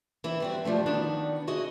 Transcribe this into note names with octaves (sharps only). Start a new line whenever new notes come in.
E3 C4 E4
G3 C4 F#4
D3 F3 G3 A3 D4
D#3 B3 D4 F#4
E4 F#4 G#4 D#5